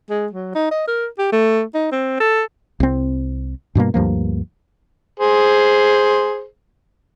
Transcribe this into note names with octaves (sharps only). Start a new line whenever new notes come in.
G#3
F#3
D#4
D#5
A#4
G4
A3
D#4
C4
A4
C2 C4
G2 B2 G3 A#3
D2 G2 F3 A#3
G#4 C5